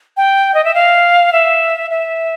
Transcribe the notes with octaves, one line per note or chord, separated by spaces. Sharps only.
G5
D#5
E5
F5
E5
E5